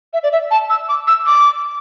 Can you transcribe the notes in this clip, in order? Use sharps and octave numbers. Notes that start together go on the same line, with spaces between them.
E5
D5
E5
A5
E6
D6
E6
D6